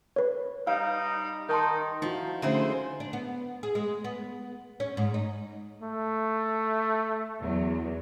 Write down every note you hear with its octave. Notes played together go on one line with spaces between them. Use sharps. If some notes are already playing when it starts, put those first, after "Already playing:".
B4 C#5
G3 D#4 F5 F6
D#3 D#4 A#4 A5 C6
F3 D#4 E4 F#4
D3 G#3 A3 C#4 E4 C5 E5
D4
B3
G#4
G#3
B3
C#4
G#2
D#4
A3
E2 F#3